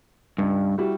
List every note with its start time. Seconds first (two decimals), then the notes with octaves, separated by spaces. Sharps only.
0.38 C#2 G2
0.78 G3 E4 F#4